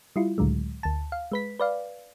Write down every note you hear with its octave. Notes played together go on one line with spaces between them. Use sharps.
G3 E4 F4
C#2 A2 D3 F#3 G#3
D2 A5
F5
G#3 B4 B6
B4 D5 F5